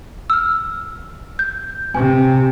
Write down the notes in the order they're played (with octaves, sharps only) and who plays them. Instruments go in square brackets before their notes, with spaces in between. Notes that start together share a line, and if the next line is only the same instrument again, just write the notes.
[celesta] E6 F6
G6
[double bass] C3 [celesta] G#5